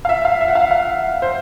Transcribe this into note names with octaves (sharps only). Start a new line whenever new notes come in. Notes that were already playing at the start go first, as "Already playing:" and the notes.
F5
E5
F5
E5
F#5
F5
F5
C5